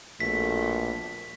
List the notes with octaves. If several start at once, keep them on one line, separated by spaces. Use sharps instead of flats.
A#1 B2 A3 B6